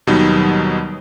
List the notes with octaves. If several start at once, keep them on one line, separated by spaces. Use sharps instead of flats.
D#2 B2 F#3 G3 B3 D#4